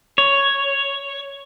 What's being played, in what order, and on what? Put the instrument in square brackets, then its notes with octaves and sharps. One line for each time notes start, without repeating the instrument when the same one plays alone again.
[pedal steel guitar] C#5